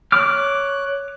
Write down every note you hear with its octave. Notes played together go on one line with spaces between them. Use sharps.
C#5 D6 F6 F#6